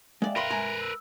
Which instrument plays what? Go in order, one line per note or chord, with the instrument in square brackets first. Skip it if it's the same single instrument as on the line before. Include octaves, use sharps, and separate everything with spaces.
[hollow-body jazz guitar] G#3 D5 [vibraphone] E5 F5 G5
[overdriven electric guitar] A#4 B4 [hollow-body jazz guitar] B5 C6
[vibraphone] G#3 E5 C6 [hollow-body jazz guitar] G#5 A#5
[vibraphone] E6